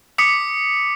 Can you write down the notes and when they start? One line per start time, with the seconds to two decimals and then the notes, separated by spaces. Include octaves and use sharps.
0.18 D6 D#6 B6 C#7